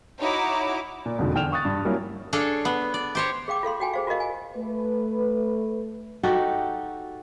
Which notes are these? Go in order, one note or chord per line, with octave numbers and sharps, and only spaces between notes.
D#4 E4 F#4 C#5 A#5 D6
A#2
E1 C2 F2 G#2 B2 D3
E2 D3 G5 F6 E7 F7
C#6 D#6 F#6 A6
G2
F#3 G3 A#3 C#4 E4
D4 G#4 A4 C#5 F5
B3
D5
G4 C5 C#5
G#4 F5 G5 D6
F4 A4 F5 C6
F#4 G5 G#5
G#4 C5 F5
F4 F#4 A#4 D#5 F5
G#5
A3 B4
D#4 F#4 G4 A4